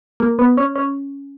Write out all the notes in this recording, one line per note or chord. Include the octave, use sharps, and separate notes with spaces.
A#3
B3
C#4
C#4